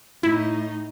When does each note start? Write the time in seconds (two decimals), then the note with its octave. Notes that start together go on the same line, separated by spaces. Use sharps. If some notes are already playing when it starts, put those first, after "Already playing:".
0.23 A2 D#4 E4